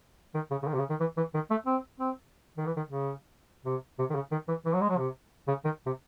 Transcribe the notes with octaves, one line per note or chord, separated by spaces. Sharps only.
D#3
C#3
C#3
D#3
C3
C#3
D#3
E3
E3
D#3
A3
C4
C4
D#3
E3
D#3
C#3
C3
C3
D#3
C#3
D#3
E3
E3
F#3
G#3
F#3
C3
C#3
D#3
C3